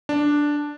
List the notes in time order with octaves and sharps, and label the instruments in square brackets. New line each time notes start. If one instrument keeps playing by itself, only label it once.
[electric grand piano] D4